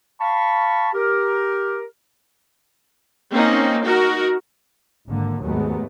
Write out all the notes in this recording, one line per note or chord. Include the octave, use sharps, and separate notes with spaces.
F5 A5 B5 C#6
G4 A#4
A#3 C4 C#4 D#4
D#4 F#4 A#4
G#1 D3 A#3
D#2 G#2 F#3 G#3 A3 B3